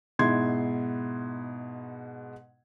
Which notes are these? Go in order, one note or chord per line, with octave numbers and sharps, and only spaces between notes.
G#2 B2 E4 C6 G#6